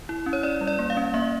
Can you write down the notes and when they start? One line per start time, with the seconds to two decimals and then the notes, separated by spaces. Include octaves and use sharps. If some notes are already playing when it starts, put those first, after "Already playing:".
0.09 E4
0.26 C#4
0.33 C#5
0.43 C#4 D5
0.61 G3
0.67 D5
0.79 A#3
0.90 F5
0.97 C#4
1.14 A#3 E5